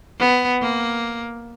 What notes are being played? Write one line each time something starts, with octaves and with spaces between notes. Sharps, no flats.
B3
A#3